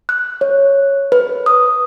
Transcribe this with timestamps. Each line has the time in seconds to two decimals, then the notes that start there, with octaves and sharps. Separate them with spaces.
0.09 F#6
0.41 C#5
1.12 B4
1.46 D#6